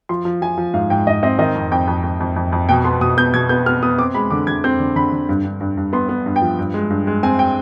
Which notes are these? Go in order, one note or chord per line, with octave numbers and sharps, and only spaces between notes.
F3 C6
F3
F3 G#5
F3
G#2 F5
G#2 G5
G#2 D#5
C4 D#5
D#3 D#5
F2
F2 G5
F2
F2
F2
F2
F2
B2 G5
B3 C6
B2 D#6
B3 G6
B2 G#6
B3 G6
B3 F6
B3 D#6
C4 D6
G#3 B5
D3 D6
D3 G#6
C4 G6
D3
D3 B5
D3
G2
G2
G2
G2
B3 C6
B3
G2
G5
F3
G2
G#3
G2
G#3
C4 G#5
G5